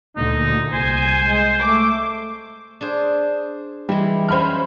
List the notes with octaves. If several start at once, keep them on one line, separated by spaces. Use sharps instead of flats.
D2 A#2 D3 D#4
C2 C5 G#5
G#3
A3 D6
D4 G#4 C5
E3 G3 G#3
F#3 C#4 C5 B5 F6